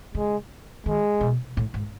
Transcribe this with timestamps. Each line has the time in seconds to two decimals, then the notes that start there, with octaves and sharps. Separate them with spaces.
0.15 C#3 G#3
0.86 D#3 G#3
1.21 B2
1.57 A2
1.74 G#2